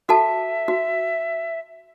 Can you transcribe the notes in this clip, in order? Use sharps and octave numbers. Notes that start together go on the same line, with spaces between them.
F#4 A4 E5 A5
F#4